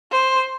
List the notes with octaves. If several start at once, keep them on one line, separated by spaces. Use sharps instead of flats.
C5